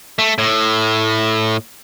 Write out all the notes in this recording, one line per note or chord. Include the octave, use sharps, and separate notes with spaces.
A3
A2